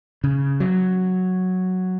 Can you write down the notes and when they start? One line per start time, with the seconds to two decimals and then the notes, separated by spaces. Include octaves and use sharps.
0.24 C#3
0.60 F#3